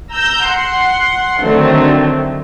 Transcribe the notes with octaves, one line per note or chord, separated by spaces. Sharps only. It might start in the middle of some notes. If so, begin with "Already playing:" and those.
A#5 E6 G6
F#5 C6
D3 D#3 F#3 A3 C4